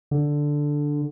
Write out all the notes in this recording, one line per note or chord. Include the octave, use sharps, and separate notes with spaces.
D3